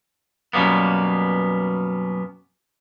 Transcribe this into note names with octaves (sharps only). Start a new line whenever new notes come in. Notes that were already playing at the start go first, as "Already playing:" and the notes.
F#2 B2 G3 A#3 B3